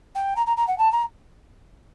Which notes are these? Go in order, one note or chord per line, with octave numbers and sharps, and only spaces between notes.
G5
A#5
A#5
A#5
F#5
A5
A#5